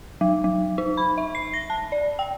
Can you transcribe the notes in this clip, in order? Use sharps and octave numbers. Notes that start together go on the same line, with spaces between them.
F#3
F#3
D#4
B5
E5
C7
A#6
A5
D5
G5